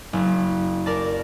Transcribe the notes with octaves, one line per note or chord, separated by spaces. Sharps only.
F#1
A#4 D5 A5